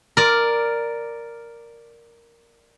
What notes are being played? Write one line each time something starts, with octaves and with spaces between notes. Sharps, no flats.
A#4 D5